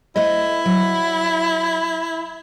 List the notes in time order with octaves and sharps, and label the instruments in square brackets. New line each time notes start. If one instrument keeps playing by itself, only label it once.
[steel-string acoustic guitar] A3 C5 D#5 [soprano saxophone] E4
[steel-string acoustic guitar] F#3